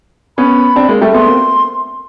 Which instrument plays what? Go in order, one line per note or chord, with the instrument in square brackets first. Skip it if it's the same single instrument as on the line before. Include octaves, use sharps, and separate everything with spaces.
[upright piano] B3 C#4 [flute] B5
[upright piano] C4 D4
G#3 A#3
G3 A3
[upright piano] A3 B3 [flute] C6
[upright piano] A#3 C4